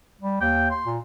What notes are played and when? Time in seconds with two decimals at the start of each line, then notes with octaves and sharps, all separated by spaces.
0.21 G3
0.41 D#2 G5
0.71 C6
0.86 A#2